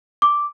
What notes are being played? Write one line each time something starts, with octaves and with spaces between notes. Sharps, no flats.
D6